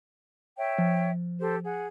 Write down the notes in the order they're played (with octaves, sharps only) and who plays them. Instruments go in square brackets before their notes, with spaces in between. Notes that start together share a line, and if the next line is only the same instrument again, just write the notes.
[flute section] C#5 E5 G5
[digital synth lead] F3
[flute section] G4 A4 C5
G#4 F#5